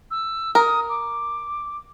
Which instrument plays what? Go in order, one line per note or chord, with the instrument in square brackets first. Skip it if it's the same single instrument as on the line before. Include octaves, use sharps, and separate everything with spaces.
[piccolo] E6
[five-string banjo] A#4 [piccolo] D#6
[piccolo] D6